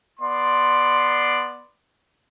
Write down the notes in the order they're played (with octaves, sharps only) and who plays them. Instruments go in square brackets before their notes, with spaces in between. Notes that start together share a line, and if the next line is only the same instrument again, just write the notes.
[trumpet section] B3 D5 C6